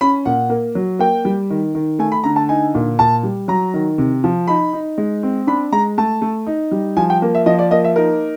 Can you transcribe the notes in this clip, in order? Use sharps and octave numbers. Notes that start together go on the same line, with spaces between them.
C#4 B5
A#2 F#5
A#3
F#3
A#3 G5
G3
D#3
D#3
A3 G#5
B5
D3 A#5
A5
D#4 G#5
A#2
A#2 A5
G3
F#3 A#5
D#3
C3
F3
D#4 B5
D#4
G#3
C4
D4 B5
G#3 A#5
A3 A5
A3
D#4
G3
F3 G#5
G5
A#3
E5
F3 D#5
D5
A#3 D#5
E5
D#4 A#4